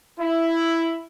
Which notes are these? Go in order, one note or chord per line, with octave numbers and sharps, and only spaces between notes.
E4